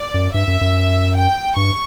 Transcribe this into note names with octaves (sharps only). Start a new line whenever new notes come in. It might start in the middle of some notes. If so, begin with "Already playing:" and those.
Already playing: D5
F#2
G2 E5
F#2
F#2
G5
G2 C#6